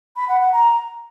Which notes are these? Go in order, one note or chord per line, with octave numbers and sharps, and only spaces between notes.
B5
F#5
F#5
A#5